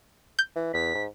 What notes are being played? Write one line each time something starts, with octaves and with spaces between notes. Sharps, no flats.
G6
E3
E2 B6
G#2